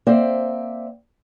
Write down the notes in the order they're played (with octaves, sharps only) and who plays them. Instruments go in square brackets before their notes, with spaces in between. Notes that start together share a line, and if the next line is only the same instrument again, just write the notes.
[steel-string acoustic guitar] A#3 C4 C5 D5 E5 G5